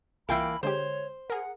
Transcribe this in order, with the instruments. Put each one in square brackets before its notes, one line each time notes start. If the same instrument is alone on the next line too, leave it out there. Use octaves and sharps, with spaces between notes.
[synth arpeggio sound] C2 F4 G5 [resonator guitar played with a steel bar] E3 A#3 [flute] B5
[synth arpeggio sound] D3 G#3 G4 [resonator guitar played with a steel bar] C5 [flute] C#5
[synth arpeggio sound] G#4 A#4 [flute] F#5